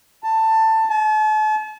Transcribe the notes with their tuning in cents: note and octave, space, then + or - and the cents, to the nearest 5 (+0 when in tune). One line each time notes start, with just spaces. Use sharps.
A5 +15
A5 -40